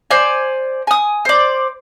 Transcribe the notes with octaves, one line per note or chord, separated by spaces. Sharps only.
C5 D5 G#5
G#5 D#6
C5 D5